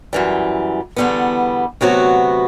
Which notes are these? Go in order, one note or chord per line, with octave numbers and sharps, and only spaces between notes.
F#2 E3 G3
E2 D3 G3 B3
D2 C3 F#3 B3 F#4